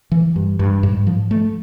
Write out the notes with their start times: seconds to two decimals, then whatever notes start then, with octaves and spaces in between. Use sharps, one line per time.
0.12 E3
0.36 G2
0.59 G2
0.83 G#2
1.07 F3
1.31 A3